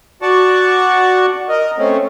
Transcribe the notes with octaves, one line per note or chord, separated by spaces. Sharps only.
F#4 D5 F#5 A5 C#6
A#4 D#5
A3 C4 C#4